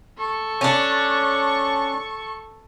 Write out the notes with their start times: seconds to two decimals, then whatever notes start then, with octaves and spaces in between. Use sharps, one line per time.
0.18 A4 C#6
0.61 C#4 D4